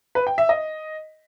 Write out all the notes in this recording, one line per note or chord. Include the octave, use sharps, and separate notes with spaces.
B4
G5
E5
D#5